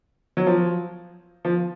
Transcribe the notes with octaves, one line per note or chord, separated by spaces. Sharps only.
F#3
F3
F3